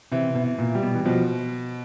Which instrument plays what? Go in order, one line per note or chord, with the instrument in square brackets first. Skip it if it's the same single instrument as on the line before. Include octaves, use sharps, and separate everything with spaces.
[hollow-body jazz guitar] C3 [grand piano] E3
[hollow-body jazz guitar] B2
[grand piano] E3
[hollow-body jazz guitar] A#2
[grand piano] G3
[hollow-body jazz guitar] B2
E3
[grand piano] B2 [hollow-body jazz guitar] F3